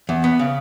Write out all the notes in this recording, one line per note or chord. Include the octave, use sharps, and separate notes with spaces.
E2
B3
C#3